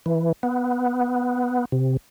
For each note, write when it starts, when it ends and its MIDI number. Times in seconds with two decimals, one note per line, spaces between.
0.06 0.32 52
0.43 1.65 59
1.72 1.97 48